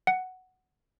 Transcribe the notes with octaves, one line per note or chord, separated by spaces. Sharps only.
F#5